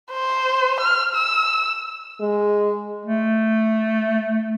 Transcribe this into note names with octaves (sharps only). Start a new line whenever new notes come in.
C5
F6
E6
G#3
A3